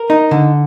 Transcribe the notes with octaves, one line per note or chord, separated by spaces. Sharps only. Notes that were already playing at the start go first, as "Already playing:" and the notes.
Already playing: A#4
D#4
D3